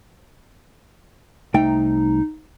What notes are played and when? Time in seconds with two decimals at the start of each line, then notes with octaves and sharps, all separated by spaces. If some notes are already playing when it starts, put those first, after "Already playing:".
1.54 C2 A3 D#4 G5